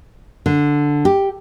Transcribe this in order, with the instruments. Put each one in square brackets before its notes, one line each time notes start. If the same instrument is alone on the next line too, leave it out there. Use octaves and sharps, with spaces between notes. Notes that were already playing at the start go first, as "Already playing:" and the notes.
[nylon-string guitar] D3
G4